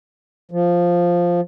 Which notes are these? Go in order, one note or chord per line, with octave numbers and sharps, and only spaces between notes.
F3